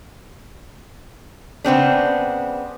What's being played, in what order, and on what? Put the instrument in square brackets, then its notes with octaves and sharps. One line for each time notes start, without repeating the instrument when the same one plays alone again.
[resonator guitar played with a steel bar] C#3 B3 C4 D4